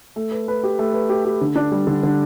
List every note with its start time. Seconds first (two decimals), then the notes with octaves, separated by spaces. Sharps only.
0.16 A3
0.31 B4
0.48 B4
0.63 G4
0.79 A3
0.94 B4
1.09 G4
1.25 G4
1.41 D3
1.56 D4
1.71 G3
1.87 D3
2.03 D3